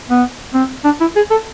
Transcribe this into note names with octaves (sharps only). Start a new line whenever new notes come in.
B3
C4
D4
E4
G#4
A4